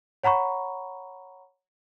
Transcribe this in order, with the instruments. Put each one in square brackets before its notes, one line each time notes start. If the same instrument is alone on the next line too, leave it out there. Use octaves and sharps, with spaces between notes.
[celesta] C#5 F#5 A#5 B5 C#6